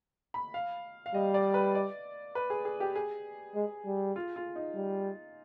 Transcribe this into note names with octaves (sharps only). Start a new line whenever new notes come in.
B5
F5
F5
G3 D#5
D5
B4
D5
B4
G#4
G#4
G4
G#4
G#3
G3
F4
F4
D#4
G3